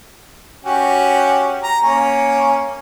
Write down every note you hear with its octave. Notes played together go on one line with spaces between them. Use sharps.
C#4 F#4 G4
A#5
A#3 C#4